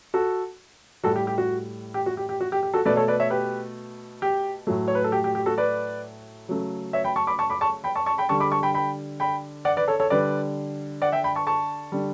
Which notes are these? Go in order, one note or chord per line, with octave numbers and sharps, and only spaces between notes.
F#4 A4
A2 G3 F#4 A4
G4
G4
F#4
G4
F#4
G4
G4
F#4
G4
G4
F#4 A4
B2 A3 B4 D5
A4 C#5
B4 D5
C#5 E5
G4 B4
G4
A2 F#3 A3
C#5
B4
A4
G4
G4
G4
F#4 A4
B4 D5
C#3 F#3 A3
C#5 E5
G5 B5
A5 C#6
B5 D6
A5 C#6
B5 D6
A5 C#6
G5 B5
A5 C#6
A5 C#6
G5 B5
D3 G3 A5 C#6
B5 D6
A5 C#6
G5 B5
G5 B5
G5 B5
D5 F#5
B4 D5
A4 C#5
A4 C#5
D3 G3 B4 D5
D5 F#5
E5 G5
G5 B5
A5 C#6
A5 C#6
D3 G3